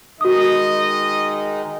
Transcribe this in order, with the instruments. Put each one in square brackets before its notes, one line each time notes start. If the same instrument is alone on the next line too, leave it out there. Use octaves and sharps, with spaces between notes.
[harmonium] D#3 G#3 D#4 [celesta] F#4 D#6 [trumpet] D#5